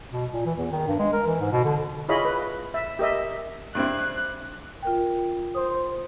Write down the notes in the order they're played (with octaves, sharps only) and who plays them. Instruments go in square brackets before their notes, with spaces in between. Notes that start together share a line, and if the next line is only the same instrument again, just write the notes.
[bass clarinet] B2
A#2
E3
E2
D#3
G2
G#3
A#4
E3
G#2
B2
D3
[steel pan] E4 F4 G#4 C#5 D#5 B5
B4
E5
G4 A#4 D#5 E5
[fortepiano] G2 C4 E4 [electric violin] F#6
[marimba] F4 A#4 G5
[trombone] C5 [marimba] D#6